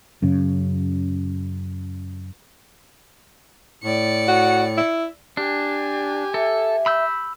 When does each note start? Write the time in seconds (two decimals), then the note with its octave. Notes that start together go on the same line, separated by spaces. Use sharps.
0.22 F#2 C#3
3.83 A2 D5 C#7
4.28 F#4
4.77 E4
5.37 D4 G4 G#5
6.34 A4 E5
6.86 B5 E6 G6